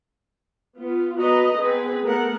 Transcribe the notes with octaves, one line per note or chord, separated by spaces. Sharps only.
B3 F4
B3 F#4 B4 D#5 A#5
B3 C4 G#4 B4
A3 B3 A#4 F#5